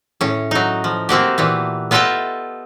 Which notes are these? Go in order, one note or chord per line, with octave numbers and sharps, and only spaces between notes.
A2 C#4
F#3 D#4
F3
A#3 C4 F#4 G4
A#2 E3 B3
B3 F4 A4 D#5 E5 G5